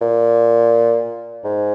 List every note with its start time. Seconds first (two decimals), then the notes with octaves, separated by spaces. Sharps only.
0.01 A#2
1.44 G#2